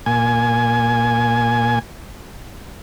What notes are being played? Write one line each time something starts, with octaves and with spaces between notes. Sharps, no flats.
A#2 G#5